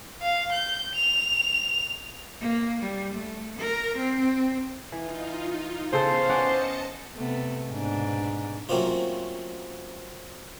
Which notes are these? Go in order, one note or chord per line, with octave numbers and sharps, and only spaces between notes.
F5
G6
F7
A#3
G3
A3
A#4
C4
E3 D#4 F4
C#3 B3 C#4 A4 C5 F5
C#4 D5 D#5 F#5 A5 C#7
C3 A3 B3
G#2 B2 D4
F#3 A3 A#3 C4 C#4 F4